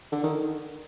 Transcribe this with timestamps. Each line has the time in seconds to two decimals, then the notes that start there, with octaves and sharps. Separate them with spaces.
0.12 D3
0.24 D#3